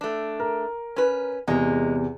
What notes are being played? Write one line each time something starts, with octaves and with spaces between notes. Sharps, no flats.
A3 D4
A#4
C#4 B4
E2 C3 G#3 A#3